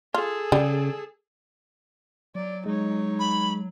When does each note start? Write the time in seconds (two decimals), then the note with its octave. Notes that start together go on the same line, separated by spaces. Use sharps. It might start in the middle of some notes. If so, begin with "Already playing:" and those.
0.14 F4 G#4 A4
0.52 C#3 G3
2.35 F#3 D5
2.66 G#3 D#4 C#5
3.19 B5